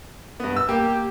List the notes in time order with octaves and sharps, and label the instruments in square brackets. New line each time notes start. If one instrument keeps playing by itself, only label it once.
[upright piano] G2 B3
E6
[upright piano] A#3 [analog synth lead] G4